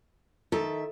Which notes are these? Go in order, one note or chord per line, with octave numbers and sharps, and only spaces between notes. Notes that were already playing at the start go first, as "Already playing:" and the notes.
D#3 A4 E5